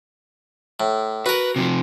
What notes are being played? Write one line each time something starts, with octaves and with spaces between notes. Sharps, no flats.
A2
F#4 A#4 B4
C3 E3 F3